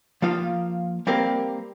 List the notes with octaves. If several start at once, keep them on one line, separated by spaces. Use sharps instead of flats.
F3 A#3 F4 F5
G3 A#3 C4 G4 A#4